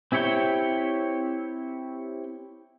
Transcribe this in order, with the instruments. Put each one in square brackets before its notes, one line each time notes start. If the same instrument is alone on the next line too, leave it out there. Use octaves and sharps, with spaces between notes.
[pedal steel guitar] C4 E4 G4 C#5 G5